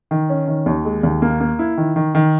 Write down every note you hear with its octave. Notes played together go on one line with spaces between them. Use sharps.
D#3
C#4
D#3
D#2
G#3
D#2
A#3
A#3
E4
D#3
D#3
D#3